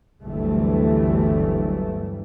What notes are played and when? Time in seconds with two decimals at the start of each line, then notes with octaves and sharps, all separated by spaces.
0.23 G1 D2 E3 F#3 G3 A3